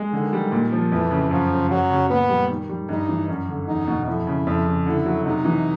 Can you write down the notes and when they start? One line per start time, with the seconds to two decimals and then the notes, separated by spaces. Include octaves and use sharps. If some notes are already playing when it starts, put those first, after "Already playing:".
Already playing: G#3
0.12 D3 D#3
0.33 G3
0.52 A#2
0.72 F3
0.92 F2 E3
1.11 C#3
1.31 F#2 F3
1.51 C#3
1.70 F#2 F#3
1.90 C#3
2.10 A#2 B3
2.29 G3
2.49 D#3
2.69 G3
2.89 G2 D#4
3.09 E3
3.28 F#2
3.48 D3
3.67 E2 D#4
3.87 B2
4.07 F2 E4
4.27 C#3
4.47 F2
4.67 C#3
4.86 D3 E4
5.06 F#3
5.25 C3 D#4
5.45 E3